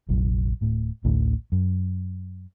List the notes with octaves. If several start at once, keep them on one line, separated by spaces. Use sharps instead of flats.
F1 A#1 F#3
D1 A2
A1 D2 A2 D3
F#2